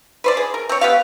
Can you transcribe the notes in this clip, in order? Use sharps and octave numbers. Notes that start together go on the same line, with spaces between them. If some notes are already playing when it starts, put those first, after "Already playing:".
B4 C5 D5
G#4
A#4
C4 C#5
B3 G4 F5